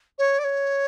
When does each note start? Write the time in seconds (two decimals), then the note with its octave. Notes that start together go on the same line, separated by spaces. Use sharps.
0.18 C#5
0.38 D5
0.44 C#5